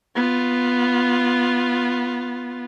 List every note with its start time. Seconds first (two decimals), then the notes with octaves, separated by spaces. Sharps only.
0.15 B3 F4